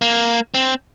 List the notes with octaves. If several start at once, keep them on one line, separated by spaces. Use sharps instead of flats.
A#3
C4